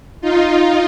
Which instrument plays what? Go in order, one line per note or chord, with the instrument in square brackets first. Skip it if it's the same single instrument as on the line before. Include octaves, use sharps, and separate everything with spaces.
[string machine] D#4 F4